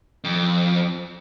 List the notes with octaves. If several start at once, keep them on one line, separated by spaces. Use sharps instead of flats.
F2